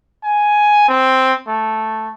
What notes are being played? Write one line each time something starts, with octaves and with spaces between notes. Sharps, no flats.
G#5
C4
A3